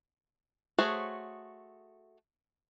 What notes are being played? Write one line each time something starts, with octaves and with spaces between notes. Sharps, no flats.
A3 F#4 G#4 C5 C#5